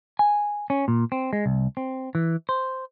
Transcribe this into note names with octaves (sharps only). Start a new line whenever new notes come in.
G#5
C#4
A#2
C4
G#3
C2
C4
E3
C5